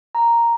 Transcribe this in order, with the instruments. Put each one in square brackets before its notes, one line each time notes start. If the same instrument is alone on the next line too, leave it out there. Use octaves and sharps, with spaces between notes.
[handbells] A#5